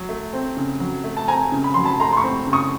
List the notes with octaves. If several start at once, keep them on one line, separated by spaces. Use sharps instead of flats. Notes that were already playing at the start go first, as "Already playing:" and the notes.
Already playing: F#3
A3
C4
C#3
F#3
A3
A5
C4 G#5 A#5
C#3
B5
F#3 C6
A5 B5
A3 A#5 C6
C6
B5 C#6
C4
C#3
C#6 D#6